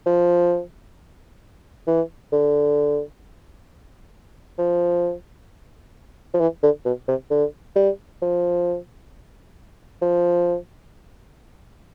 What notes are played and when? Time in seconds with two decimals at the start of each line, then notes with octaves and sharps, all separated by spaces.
0.06 F3
1.88 E3
2.32 D3
4.58 F3
6.34 F3
6.40 E3
6.63 D3
6.85 B2
7.08 C3
7.30 D3
7.76 G3
8.22 F3
10.02 F3